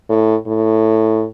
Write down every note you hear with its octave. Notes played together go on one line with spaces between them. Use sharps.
A2
A2